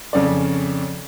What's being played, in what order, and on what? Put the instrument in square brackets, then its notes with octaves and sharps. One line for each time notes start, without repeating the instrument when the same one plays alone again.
[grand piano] F2 C#3 C#4 D5